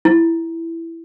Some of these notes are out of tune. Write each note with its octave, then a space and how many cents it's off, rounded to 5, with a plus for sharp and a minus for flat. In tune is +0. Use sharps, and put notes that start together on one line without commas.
E4 +10